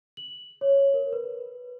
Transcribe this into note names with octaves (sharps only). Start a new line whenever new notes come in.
F#7
C#5
A#4
B4